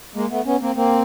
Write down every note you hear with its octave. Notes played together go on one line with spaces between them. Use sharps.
G#3 A#3
A3 B3
B3 C#4
A#3 C4
A#3 C4